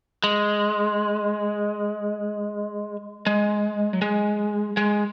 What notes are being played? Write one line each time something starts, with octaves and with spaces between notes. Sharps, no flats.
G#3
G#3
F#3
G#3
G#3